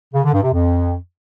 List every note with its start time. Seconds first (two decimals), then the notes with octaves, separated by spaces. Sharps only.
0.14 C#3
0.23 D3
0.33 G2
0.42 C3
0.52 F2